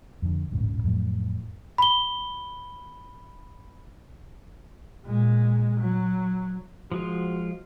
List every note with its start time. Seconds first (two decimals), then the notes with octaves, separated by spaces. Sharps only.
0.22 F2 D3
0.51 D#1 A1 G#2 C#3
0.84 F2 A2 F#3
1.78 B5 G7
5.05 A#2 G#3
5.80 F#3
6.92 F3 G#3 F4 F#4